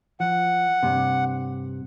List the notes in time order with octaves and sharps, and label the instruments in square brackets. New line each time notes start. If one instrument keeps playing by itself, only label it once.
[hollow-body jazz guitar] F3 [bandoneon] F#5
[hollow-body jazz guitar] G2 C3